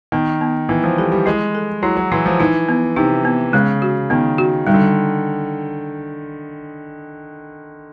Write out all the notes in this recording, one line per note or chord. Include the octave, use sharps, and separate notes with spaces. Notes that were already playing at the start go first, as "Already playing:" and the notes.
D#3 B3
B3
E3 B3
F3
G3 A4
G3
G#3 E4
A4
F#3 E4
F#3
E3 E4
F3
E3 D#4
B3
C3 D#4
B3
C#3 G#3
F#4
D#3 B3
F#4
D#3 G3
D3